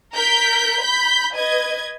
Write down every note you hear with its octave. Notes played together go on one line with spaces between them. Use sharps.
A#4 G6 B6
B5 G6 B6
B4 D#5 G#6